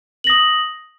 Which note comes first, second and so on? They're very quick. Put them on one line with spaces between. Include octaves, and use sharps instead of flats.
F#7 A#6 D#6